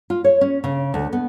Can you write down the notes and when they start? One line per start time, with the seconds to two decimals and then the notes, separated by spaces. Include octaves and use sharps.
0.10 F4
0.24 C#5
0.41 C#4
0.64 C#3
0.94 D2
1.13 B3